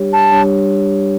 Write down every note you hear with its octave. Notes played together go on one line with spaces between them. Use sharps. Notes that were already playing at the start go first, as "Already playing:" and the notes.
Already playing: G3 D4 G4 C#5
A5
G3 D4 G4 C#5